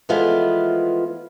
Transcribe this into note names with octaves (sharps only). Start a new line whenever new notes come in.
E3 F3 G#3 A3 B3 F4